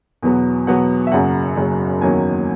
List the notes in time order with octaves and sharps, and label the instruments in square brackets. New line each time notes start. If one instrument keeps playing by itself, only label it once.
[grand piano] E2 B2 F#3 B3
E2 B2 F#3 B3 F#5
E5
F#1 F#2 C#3 F#3 F#5
F#1 F#2 C#3 F#3
E2 D#3 F#3 A#3 C#4 G#5